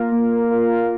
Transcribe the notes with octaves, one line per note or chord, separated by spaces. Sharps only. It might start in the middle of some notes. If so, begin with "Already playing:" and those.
Already playing: A#3 F4 A#4
A#3
F4 A#4